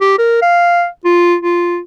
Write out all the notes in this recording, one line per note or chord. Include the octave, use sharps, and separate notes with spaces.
G4
A#4
F5
F4
F4